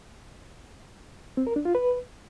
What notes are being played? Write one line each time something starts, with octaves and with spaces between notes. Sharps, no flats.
C4
A#4
D4
F4
B4